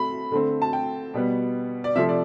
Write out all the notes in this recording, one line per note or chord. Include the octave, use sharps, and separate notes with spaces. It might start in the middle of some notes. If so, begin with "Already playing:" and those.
Already playing: A3 C4 B5
D3 A3 C4
A5
G5
B2 G3 B3
D5
C3 F3 A3 C4 E5
D5